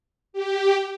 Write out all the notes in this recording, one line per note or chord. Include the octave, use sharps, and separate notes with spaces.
G4